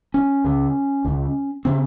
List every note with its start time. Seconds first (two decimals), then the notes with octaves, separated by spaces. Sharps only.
0.14 C#4
0.44 C#2 C#3
1.05 C#2 C#3
1.65 C#3 C4